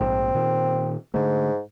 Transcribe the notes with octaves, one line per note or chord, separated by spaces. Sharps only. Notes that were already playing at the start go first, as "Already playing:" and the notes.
A#1 G#2 C4
A#2 D#3
G#2 D3 A3